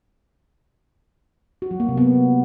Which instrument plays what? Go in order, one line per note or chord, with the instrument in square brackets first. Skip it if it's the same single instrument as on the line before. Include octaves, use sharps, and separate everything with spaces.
[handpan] F#4
F#3
A#3
C3
B3